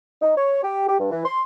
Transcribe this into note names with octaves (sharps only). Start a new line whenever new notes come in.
D#4
C#5
G4
G4
G2
E3
C6